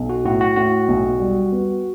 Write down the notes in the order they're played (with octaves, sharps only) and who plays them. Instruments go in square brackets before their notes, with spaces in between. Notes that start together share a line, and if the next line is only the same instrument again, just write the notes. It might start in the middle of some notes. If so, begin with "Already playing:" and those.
Already playing: [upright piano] B1
[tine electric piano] F#4
[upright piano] A2 [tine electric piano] F#4
[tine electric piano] F#4
[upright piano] A2 [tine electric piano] F#4
[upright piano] B1
G3
B3